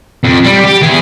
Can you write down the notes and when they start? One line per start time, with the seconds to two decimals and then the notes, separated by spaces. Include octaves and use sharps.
0.24 F2
0.46 G3
0.65 G4
0.82 E3 G#4